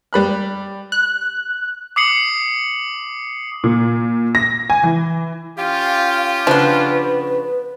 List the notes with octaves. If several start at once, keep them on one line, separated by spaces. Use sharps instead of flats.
G3 B5 F#6
F#6
D6 D#6 C7 C#7 F#7
A#2
A#6
G#5
E3
C#4 F4 G4 F5
C#3 F3 B3 D4 B4